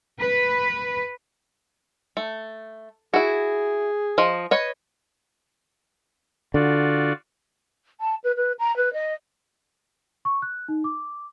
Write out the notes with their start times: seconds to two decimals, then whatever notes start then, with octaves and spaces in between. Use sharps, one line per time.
0.19 B4
2.17 A3
3.14 E4 F#4 G#4
4.18 F3 D#5
4.51 B4 C#5 D#5
6.54 D3 F4 F#4 D5
8.00 A5
8.24 B4
8.36 B4
8.59 A#5
8.76 B4
8.93 D#5
10.25 C#6
10.42 F#6
10.68 D#4
10.84 D6